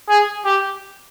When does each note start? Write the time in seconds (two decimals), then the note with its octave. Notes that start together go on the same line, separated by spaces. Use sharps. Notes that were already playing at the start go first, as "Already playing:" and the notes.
0.09 G#4
0.45 G4